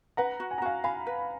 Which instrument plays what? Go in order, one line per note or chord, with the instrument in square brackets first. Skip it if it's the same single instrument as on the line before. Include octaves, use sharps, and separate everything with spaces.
[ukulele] B4 [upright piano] F#5 A#5
[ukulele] F#4
[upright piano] G#5
A#5
[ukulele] F#4 [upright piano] F5 G#5
[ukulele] F5 [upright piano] G#5 B5
[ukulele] B4